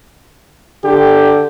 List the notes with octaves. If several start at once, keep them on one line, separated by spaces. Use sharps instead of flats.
D3 G4